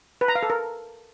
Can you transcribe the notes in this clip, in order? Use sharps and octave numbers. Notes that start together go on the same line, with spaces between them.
B4
A#5
F5
A4
A#4